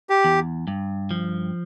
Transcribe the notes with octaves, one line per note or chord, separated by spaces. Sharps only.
G4
E2
G2
F3